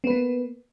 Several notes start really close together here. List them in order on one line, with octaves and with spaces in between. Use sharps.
B3 B4 A#3